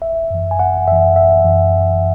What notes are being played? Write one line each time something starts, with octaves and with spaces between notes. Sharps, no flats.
G#1 E5
F#2 E3
G#5
G#1 F#5
F#2 E3 E5
G#1 E5
F#2 E3
G#1